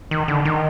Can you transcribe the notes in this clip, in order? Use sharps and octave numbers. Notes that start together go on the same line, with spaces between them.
D#3
D3
D#3